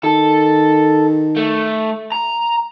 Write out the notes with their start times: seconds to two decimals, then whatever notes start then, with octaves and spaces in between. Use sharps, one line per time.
0.04 D#3 A4
1.36 A3
2.12 A#5